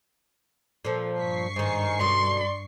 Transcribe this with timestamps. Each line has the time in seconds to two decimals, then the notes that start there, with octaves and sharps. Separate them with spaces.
0.85 A#2 F3 A4
1.19 G2 C#6 B6 C7
1.56 G#2 D#3 G#5
2.00 F#2 B2 D3 D5 C6